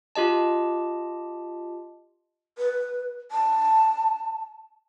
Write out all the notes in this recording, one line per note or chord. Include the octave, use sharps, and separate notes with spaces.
F4 G4 D#5 A5
B4
A5